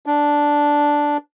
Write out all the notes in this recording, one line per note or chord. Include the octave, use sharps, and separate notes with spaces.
D4